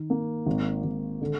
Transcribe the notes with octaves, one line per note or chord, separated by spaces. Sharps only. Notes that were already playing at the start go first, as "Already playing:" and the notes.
Already playing: D#3
A#3
G#1
G#1
D3